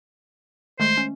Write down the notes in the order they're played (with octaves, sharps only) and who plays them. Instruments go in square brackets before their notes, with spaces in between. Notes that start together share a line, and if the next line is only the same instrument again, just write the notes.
[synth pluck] D#3 G#3 A3 [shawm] C5
[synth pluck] C#4